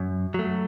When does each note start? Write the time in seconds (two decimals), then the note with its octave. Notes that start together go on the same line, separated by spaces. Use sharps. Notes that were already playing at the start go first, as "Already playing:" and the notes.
Already playing: F#2
0.34 F#3 A3